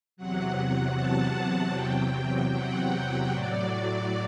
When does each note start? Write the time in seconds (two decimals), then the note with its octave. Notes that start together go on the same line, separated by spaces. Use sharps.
0.17 E2 C3 F#3 F#5
0.95 A5
1.74 E2 C3 F#3 G5
2.53 F#5
3.32 A2 F#3 D5